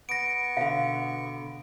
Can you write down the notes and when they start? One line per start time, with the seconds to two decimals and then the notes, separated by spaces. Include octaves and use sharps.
0.09 B3 C#6 A#6 D7
0.57 B2 D3 F5